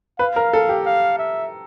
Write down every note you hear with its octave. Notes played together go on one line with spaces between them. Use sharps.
B4 F5
A#4
A4
G4
F5
E5